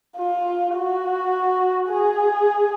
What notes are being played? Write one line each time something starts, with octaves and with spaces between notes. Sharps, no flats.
F4
F#4
G#4